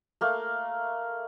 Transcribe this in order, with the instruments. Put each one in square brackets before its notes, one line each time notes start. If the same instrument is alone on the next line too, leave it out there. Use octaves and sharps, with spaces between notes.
[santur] A3 A#3